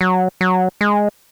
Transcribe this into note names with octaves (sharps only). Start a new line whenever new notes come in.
F#3
F#3
G#3